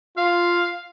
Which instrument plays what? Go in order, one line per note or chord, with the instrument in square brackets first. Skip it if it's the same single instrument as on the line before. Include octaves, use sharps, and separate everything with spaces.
[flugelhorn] F4 [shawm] F5